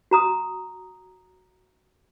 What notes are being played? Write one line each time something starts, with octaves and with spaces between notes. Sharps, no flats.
F#4 A#5 D#6